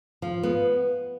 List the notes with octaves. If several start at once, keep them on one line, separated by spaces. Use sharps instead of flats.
F3
B3